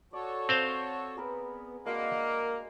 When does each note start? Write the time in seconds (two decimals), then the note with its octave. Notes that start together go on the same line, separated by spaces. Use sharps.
0.13 F#4 A4 C#5 D5
0.49 C4 C5 F5
1.17 B3 G#4 A#4 B4
1.86 G#3 A#3 D4 F#4 F#5